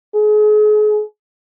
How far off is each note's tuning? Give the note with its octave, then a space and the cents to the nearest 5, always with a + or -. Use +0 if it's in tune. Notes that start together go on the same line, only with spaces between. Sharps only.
G#4 +35